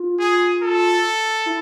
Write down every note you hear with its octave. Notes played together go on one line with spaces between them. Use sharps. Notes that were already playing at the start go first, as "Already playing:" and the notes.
Already playing: F4
G#4
A4
E4